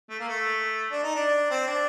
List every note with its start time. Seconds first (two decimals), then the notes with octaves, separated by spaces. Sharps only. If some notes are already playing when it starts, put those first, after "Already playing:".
0.10 A3
0.20 A#3
0.29 A3
0.92 D4
1.03 D#4
1.15 D4
1.50 C4
1.67 D4